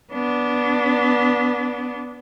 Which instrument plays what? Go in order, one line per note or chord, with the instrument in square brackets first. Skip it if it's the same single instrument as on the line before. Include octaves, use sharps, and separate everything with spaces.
[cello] B3 D4